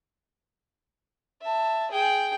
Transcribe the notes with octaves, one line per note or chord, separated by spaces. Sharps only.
E5 A5
G#4 G5